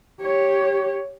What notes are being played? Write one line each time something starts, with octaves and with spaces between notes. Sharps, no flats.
G4 C#5